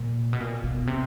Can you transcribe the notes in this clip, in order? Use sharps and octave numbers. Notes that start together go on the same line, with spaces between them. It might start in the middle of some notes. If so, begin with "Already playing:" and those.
Already playing: A#2
B2
A#2
B2
C3